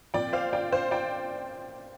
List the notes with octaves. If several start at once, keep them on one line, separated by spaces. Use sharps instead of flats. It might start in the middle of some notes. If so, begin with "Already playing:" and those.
A#2 F3 C4 D5 G5
C5 F5
D5 G5
C5 F5
D5 G5